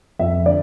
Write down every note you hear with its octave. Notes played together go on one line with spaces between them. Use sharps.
F2 E5
D3 D5